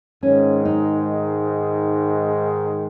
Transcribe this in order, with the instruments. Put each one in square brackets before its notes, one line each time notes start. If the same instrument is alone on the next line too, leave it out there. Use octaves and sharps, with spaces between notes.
[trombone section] G#2 D#3 G#3 [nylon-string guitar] C#4
[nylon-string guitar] D#4